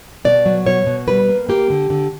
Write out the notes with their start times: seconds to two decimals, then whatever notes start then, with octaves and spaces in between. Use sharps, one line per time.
0.25 B2 D5
0.46 F#3
0.66 B2 C#5
0.87 B2
1.08 G3 B4
1.29 A#3
1.49 A#3 G4
1.70 D3
1.90 D3